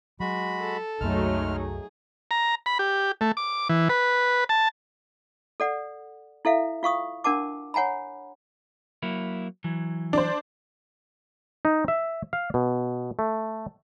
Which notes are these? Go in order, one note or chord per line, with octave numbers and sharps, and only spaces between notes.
F#3 G#3 F#4 B5
A4
C2 F#2 F#3 G#3 A3 D#4 F6
G#4
A#5
B5
G4
A3
D6
E3
B4
A5
A4 D5 F#5
E4 A4 E5 F5
F4 F5 C#6 D#6
D4 A#4 F#5 A5 D6
C#5 F#5 G#5 A#5 B5
F#3 A#3 E4
E3 F#3
D4 C5
D#4
E5
F5
B2
A3